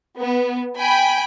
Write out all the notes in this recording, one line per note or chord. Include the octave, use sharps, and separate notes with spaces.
B3
G5 G#5 B5